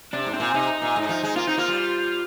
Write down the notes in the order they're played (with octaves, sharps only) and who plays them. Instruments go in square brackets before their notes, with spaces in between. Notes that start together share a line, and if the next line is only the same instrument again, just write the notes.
[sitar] C3 [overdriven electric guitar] D4
[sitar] G#2
[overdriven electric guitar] C4
[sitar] A#2
[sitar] C3 [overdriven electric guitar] D#4
[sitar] A#2
G#2
F3
G#3
[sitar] A#3 [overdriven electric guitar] F4
[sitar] C4 [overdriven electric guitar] D#4
[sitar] A#3 [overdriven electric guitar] F4
[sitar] G3